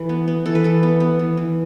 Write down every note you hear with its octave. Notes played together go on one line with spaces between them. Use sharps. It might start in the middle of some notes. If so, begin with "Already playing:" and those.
Already playing: E3 A4 B4
B3
B3
E3 A4
B4
E3 A4
B3
B3
E3
E3